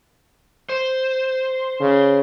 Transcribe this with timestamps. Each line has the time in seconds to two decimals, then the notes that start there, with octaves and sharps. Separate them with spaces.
0.69 C5
1.80 C#3